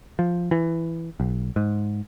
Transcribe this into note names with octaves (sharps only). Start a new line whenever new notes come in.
F3
E3
B1
G#2